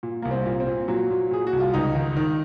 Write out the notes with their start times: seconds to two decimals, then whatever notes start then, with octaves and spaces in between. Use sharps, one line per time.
0.03 A#2
0.22 C2 A#3
0.31 C4
0.46 A#2
0.60 C4
0.67 A#2
0.88 A#2 F#3
1.10 A#2
1.31 A#2 G#4
1.47 F#4
1.53 C2
1.60 F4
1.74 C#2 D#4
1.95 D#3
2.17 D#3